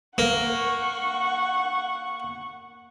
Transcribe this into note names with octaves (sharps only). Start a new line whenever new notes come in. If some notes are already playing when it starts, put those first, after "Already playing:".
A#3 F#5 C#6